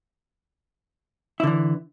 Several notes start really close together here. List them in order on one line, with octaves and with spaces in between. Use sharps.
E4 D3 E3